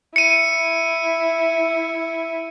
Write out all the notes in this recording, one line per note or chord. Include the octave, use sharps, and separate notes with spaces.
E4 C#7 D#7